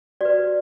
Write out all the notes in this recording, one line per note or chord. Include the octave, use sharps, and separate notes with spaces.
F#4 B4 D5